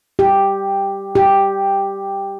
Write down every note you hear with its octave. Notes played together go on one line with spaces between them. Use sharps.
G4
G4